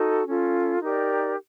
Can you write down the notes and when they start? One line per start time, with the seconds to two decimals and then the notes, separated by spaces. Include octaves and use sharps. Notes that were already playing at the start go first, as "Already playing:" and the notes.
Already playing: D#4 F#4 A4
0.26 C#4 F4 A4
0.80 D#4 G4 A#4 D5